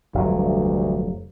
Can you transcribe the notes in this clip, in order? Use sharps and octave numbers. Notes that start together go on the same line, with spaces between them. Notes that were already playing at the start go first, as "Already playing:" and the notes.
F1 D2 G2 F#3